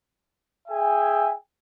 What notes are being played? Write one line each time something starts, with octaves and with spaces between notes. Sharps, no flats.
G#4 E5 G5 G#5